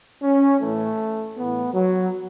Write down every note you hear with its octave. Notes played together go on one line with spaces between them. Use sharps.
C#4
A2 E3 A3
A2 E3 B3
F#3